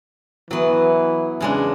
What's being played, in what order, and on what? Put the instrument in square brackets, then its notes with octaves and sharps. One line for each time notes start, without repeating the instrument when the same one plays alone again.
[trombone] E3 [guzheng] F#3 B3
[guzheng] E2 G#3 D4 [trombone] C#3